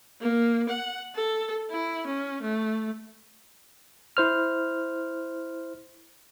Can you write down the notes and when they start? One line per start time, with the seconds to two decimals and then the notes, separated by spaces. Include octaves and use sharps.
0.21 A#3
0.69 F#5
1.15 A4
1.70 E4
2.07 C#4
2.42 A3
4.17 E4 C5 F6